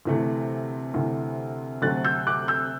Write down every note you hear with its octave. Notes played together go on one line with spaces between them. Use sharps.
D2 C3 E3 A3
D2 C3 E3 A3
D2 C3 F#3 A3 C4 F#6 A6
E6 G6
D6 F#6
E6 G6